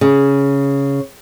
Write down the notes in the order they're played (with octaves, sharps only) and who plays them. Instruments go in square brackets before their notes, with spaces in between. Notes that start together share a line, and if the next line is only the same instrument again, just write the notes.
[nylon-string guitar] C#3